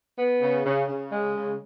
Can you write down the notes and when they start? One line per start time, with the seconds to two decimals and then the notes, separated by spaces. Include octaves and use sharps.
0.18 B3
0.41 C#3
0.65 C#3
0.88 C#3
1.11 G#3
1.35 C#3